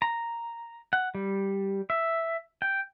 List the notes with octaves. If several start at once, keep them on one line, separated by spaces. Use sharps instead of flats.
A#5
F#5
G3
E5
G5